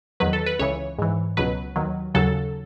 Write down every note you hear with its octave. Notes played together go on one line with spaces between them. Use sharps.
E2 D#3 F#3 B4
A4
B4
C#2 C#3 E3 C#5
G#2 E3
C#2 B2 F#3 B4
D#2 D#3 F#3
D#2 C#3 F#3 A4